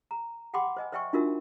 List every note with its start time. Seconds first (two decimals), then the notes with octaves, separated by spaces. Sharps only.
0.11 A#5
0.54 F#5 G5 B5 C6 D6
0.77 C5 D#5 G#5
0.92 C5 D5 E5 G5 G#5 C#6
1.13 D4 D#4 F4 F#4 A#4 E5